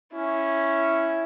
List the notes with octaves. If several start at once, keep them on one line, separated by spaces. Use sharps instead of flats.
C#4 E4